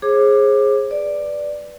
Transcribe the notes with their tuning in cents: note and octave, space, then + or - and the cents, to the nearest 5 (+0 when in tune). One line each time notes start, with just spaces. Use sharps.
G#4 +0 C5 +45 D6 +15
B4 +0 D5 +0